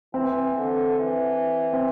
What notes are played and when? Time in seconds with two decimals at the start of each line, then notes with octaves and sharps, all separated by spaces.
0.14 E3 C4
0.57 D3
0.99 E3
1.73 C4